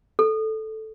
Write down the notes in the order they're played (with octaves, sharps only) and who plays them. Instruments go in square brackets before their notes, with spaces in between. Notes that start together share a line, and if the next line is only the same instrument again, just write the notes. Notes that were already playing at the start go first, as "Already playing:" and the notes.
[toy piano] A4